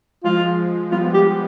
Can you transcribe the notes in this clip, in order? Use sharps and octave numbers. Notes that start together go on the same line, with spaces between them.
F3 G#3 F4
G3 B3 F4
G4